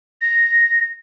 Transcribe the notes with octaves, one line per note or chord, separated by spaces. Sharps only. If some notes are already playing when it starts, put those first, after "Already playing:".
A#6